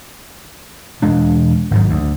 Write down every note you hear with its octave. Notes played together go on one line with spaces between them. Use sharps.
E1 G#3 D4
G#1 G#2 F#3
D2